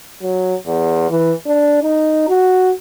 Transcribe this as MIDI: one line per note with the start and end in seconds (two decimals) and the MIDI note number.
0.22 0.55 54
0.67 1.10 40
1.10 1.32 52
1.46 1.82 62
1.83 2.23 63
2.28 2.72 66